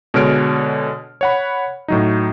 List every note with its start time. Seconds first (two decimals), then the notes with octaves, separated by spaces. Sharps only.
0.14 B2 D3 G#3 C#5 F6 D7
1.21 C#5 F#5 B5
1.88 A2 F#3 D#4